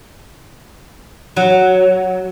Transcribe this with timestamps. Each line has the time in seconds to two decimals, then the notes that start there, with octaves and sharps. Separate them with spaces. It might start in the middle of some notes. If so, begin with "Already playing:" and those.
1.36 F#3